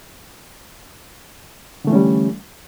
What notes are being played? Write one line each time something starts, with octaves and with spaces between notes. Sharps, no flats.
D3 E3 G3 A3 C#4